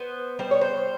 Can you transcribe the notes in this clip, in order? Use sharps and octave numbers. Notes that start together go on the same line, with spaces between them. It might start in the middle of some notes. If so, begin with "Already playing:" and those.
Already playing: B3 C5
G3 C5
C#5
C5